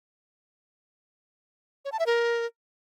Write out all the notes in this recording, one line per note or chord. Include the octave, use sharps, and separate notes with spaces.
C#5
A5
E5
A#4